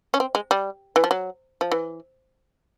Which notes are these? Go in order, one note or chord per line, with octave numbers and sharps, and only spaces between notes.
C#4
C4
G#3
G3
E3
F3
F#3
F3
E3